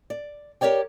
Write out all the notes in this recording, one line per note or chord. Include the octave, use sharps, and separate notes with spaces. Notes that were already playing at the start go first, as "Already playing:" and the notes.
D5
G4 A#4 C#5 D5 G5